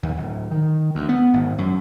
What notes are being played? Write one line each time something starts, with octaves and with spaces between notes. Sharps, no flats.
D#2
D1
D#3
D2
B3
G#1
F#2